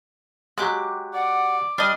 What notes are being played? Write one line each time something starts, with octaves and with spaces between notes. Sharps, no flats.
F#3 G#3 G4 D6 F#6
D5 F#5
G3 D4 D#5 F6